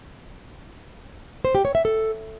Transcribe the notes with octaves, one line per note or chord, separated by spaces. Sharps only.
C5
G4
C#5
E5
A4